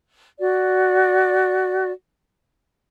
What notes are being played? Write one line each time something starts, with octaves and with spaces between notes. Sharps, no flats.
F#4 D5